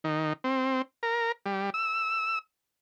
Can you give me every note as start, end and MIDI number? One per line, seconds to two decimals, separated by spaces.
0.04 0.33 51
0.44 0.82 60
1.03 1.32 70
1.46 1.70 55
1.74 2.39 88